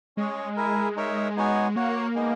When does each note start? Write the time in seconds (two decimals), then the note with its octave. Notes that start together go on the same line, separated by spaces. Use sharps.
0.17 G#3 C#4 G#4 C#5
0.57 E4 A#4 E5 G#5
0.96 D#4 A#4 C#5 E5
1.37 B3 D#4 F#4 C#5 G#5
1.76 A#3 F#4 C#5 F#5
2.15 G#3 B3 D#4